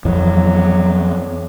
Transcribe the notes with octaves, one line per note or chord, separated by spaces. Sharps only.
F2 E3 F#3